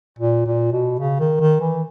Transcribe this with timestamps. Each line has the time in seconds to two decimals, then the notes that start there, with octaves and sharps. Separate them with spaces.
0.19 A#2
0.46 A#2
0.72 B2
1.00 C#3
1.20 D#3
1.40 D#3
1.60 E3